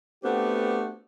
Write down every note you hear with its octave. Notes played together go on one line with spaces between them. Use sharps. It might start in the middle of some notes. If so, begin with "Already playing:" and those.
A3 B3 C4 D4 F#4 G4